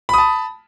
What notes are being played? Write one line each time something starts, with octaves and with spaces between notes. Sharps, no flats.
A5 B5 D#6